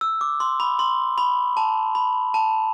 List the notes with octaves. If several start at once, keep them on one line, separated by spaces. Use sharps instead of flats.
E6
D6
C6
B5
C6
B5
A5
B5
A5